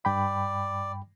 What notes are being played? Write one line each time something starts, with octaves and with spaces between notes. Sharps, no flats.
G2 D5 G5 B5